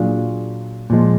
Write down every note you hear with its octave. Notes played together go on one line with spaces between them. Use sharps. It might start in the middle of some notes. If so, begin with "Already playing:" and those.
Already playing: A#2 F#3 D4 F4 G#4
A#2 F3 G#3